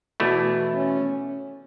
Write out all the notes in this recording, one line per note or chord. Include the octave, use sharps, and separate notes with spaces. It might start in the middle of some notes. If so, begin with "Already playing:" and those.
E2 B2 A3 E4
C#4